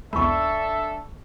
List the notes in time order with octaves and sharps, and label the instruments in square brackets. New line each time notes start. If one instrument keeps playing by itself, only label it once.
[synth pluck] B1 E2 G#3 [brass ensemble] D4 A4 [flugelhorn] E5 [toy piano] B5 C#6